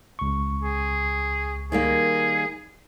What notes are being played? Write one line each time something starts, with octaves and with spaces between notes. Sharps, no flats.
C#2 C#6
G#4
D#3 G3 A#3 G#4